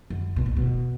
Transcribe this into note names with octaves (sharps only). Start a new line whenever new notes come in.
F#2
B2
A#2
B2